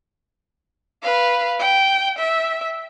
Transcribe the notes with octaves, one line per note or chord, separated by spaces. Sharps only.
B4 F5
G5
E5